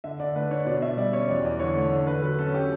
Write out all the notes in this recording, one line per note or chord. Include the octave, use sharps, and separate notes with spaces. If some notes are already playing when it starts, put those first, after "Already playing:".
D3 E5
D3 D5
A3 B4
D4 C#5
B2 D5
B2 E5
G3 D5
C#4 C#5
E2 D5
E2
D3 C#5
A3
D3
D3 B4
F#3 B4
C#4 A4
G4